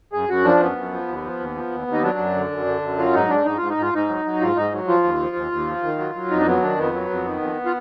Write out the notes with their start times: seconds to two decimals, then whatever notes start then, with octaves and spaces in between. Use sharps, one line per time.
0.13 F#2 G#4
0.29 F#2 F#4
0.45 F3 D4
0.60 F#2 B3
0.77 F#2
0.92 F3
1.08 D#2
1.24 F3
1.40 D#2
1.56 F3
1.71 D#2
1.87 D#2
1.93 D#4
2.03 F#3 D4
2.19 F#2
2.35 D3
2.51 F#2
2.66 D3
2.82 F#2
2.98 F#3 F4
3.14 G#2 D#4
3.30 G#2 D4
3.45 G#2 D#4
3.57 G#2 F4
3.70 D#4
3.77 G#2 F4
3.93 G#2 D#4
4.08 F#3
4.25 F#3
4.41 G#2 F4
4.56 G#2 D#4
4.73 F#3
4.88 F3 F4
5.03 D#2
5.20 F3
5.36 D#2
5.52 D#2
5.67 F3
5.83 D#3
5.98 F#3
6.15 F#3
6.30 F2 D#4
6.39 D4
6.46 F#3 B3
6.62 D#3 D4
6.78 F2 B3
6.94 F#3
7.10 F2
7.25 D#3
7.41 F2
7.65 F4